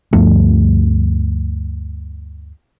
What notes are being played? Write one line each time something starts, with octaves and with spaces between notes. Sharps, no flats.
D2 G2 F3 A3